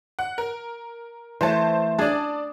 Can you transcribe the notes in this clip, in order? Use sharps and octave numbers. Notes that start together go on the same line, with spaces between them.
F#5
A#4
E3 A3 C5 A5
D4 G#4 D5 A5